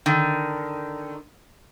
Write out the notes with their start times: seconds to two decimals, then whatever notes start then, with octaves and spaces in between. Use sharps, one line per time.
0.06 D3 D#3